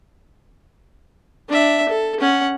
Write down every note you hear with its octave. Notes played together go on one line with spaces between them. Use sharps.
D4 E5
A4
C#4 F#5